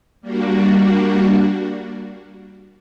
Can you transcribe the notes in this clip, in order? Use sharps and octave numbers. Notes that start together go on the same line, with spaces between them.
G3 A#3 D4 F#4